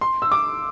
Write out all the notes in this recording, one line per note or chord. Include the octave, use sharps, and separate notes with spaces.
C6
E6
D6